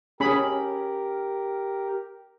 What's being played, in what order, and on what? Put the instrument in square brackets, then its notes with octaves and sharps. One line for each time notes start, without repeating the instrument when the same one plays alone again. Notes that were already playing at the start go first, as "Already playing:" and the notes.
[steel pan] C#4 G#4 B5 [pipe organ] G4 A#4